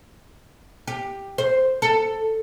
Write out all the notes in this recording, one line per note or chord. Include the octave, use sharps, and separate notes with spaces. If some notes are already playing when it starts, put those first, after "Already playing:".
G4
C5
A4